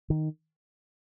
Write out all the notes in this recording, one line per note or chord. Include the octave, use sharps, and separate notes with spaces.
D#3